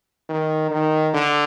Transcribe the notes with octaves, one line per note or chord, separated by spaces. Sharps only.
D#3
D#3
D3